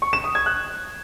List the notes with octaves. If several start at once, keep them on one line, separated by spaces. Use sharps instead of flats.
C#6
E7
D#6
G#6
F#6